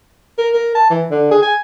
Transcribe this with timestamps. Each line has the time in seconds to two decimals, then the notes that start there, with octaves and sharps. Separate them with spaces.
0.38 A#4
0.54 A#4
0.75 A5
0.90 E3
1.11 D3
1.31 G#4
1.43 G#5